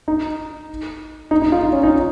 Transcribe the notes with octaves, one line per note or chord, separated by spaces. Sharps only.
D#4
D#4
D#4
F4
D#4
C#4
D#4